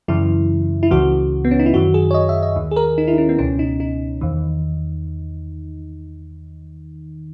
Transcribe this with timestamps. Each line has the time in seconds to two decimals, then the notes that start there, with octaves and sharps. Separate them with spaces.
0.08 F#2 C#3 E3 E4
0.83 E4
0.91 C#2 C#3 E3 F#4
1.45 B3
1.51 C#4
1.60 D#4
1.66 E4
1.74 F#2 D#3 F#4
1.94 G#4
2.11 C#5
2.14 D#5
2.29 E5
2.43 D#5
2.56 D#2 D#3
2.71 G#4
2.76 A#4
2.98 D#4
3.08 E4
3.13 D#4
3.18 C#4
3.29 B3
3.39 C#2 B2 C#4
3.59 D#4
3.80 D#4
4.21 E2 D#3